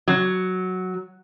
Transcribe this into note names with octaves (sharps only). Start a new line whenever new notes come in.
F#3